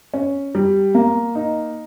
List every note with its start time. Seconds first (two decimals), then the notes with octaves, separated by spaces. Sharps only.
0.14 C#4
0.55 G3
0.95 A#3
1.35 D#4